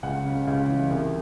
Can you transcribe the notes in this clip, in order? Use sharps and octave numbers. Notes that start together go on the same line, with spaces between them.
C#2 F#5
C#3
C#2
E3
C2